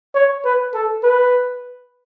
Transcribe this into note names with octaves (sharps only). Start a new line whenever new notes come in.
C#5
B4
A4
B4